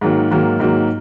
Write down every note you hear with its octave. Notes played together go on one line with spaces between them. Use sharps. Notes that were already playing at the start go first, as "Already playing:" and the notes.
G#2 D#3 F#3 A#3
G#2 D#3 F#3 A#3
G#2 D#3 F#3 A#3